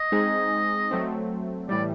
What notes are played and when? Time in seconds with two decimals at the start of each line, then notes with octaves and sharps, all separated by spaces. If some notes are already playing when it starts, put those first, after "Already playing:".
Already playing: D#5
0.12 G#3 C4 D#4 G#4
0.91 F#3 A3 C4
1.69 A2 E3 G3 D5